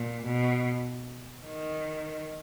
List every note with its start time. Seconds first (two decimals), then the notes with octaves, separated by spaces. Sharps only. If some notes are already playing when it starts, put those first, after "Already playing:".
Already playing: A#2
0.26 B2
1.45 D#3